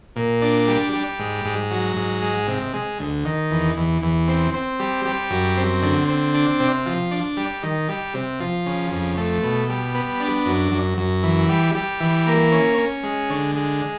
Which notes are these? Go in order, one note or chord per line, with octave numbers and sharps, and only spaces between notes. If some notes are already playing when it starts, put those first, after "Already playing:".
A#2
D4
G3
G3
G#2
G#2
F#3
G#2
G#3
C3
G#3
D2
D#3
E2
E2
E2
C4
C4
G3
G3
F#2
C4
D3
C4
D4
C3
F3
D4
G3
D#3
G3
C3
F3
C#3
F2
A3
B2
G3
B3
D4
F#2
F#2
F#2
E3
G3
G3
E3
A#3
C#4
C#4
G#3
D3
G#3